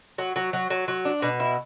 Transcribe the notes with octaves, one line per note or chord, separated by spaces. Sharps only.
F#3
F#3
F#3
F#3
F#3
D4
B2
E4